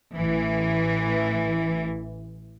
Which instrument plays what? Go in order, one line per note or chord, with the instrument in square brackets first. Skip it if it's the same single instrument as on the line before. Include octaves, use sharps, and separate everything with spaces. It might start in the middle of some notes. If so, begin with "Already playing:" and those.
[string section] A1 E3